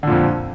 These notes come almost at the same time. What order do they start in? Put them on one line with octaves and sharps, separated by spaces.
D3 A#2 F2